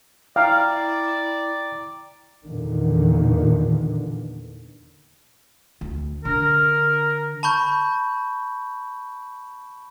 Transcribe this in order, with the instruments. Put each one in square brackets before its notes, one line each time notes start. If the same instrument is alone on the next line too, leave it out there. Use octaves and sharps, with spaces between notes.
[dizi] E4 [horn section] D5 [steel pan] F5 [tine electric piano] G5 A#5
[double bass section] E2 A#2 D3 D#3
[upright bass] D2
[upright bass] D3 [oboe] A#4
[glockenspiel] A5 B5 C#6 G6